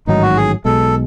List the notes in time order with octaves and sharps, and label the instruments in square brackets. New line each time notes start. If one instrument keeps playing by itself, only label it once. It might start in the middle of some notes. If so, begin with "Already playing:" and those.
[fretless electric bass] A1 G#2 D#3 F#3 [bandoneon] D#4
[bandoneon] F#4
G#4
[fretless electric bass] B1 B2 G#3 [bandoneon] A4